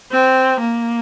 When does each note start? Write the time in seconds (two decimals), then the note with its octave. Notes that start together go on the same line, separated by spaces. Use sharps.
0.11 C4
0.60 A#3